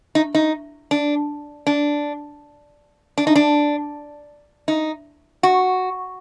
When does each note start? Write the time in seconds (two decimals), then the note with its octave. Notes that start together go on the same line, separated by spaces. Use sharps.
0.15 D#4
0.35 D#4
0.91 D4
1.67 D4
3.18 D4
3.27 D#4
3.36 D4
4.68 D#4
5.43 F#4